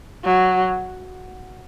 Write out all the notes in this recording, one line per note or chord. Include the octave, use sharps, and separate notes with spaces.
F#3